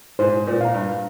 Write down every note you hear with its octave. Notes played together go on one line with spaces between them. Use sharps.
G#2 C5
A#2
F5 A#5
G2